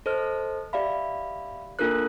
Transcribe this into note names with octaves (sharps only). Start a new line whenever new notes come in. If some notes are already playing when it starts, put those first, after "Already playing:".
A4 C5 D#5 F6
G4 D5 E5 F5 B5
A#3 D4 F4 A4 A#4 F#6